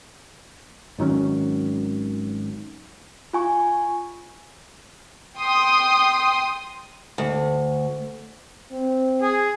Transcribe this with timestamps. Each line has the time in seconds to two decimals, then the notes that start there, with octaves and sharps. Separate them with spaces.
0.99 G#1 D#3 F#3 C#4
3.33 F4 G#5 C#6
5.38 G5 C6 D#6
7.18 D2
8.72 C4
9.22 G#4